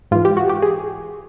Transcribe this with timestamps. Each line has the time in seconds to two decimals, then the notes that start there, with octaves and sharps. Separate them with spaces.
0.11 G#2 E3 F4
0.25 G4
0.37 F#4
0.49 G4
0.62 G#4